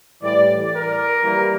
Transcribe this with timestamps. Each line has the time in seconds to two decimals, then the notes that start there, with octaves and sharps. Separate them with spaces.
0.22 A2 E3 G3 D5
0.72 A#4
1.22 E3 G3 A#3